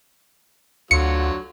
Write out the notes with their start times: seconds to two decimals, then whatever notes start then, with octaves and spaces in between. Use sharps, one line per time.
0.91 D2 D3 F#3 F4 C#7